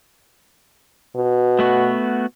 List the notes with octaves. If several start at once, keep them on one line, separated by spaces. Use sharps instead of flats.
B2
A3 B3 F#4